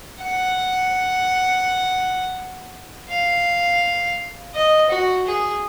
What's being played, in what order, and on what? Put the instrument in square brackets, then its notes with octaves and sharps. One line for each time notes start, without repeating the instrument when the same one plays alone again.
[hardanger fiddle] F#5
F5
D#5
F#4
G#4